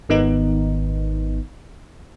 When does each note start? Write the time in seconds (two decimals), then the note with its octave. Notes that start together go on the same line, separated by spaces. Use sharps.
0.09 G#1 D#3 B3 D#4